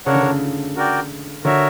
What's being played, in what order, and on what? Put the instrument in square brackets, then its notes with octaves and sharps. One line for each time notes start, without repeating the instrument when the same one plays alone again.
[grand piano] C#3 [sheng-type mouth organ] D4 A#4 C#5 F#5
[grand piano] D3
C#3
[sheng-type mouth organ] F#4 A#4 D5 G5
[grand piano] D3 [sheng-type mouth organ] F#4 A#4 C#5 E5